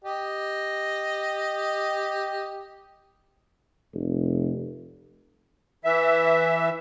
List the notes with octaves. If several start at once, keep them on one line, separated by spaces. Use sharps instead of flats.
G4 D#5
F1
E3 E5